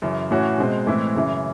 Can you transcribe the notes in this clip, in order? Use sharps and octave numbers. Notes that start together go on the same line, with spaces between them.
F#2 C#3 E3
A2 E3 A3 C#4 F#4
B2 G#3 C4
A2 E3 G#3 C4 E4
F#2 C#3 E3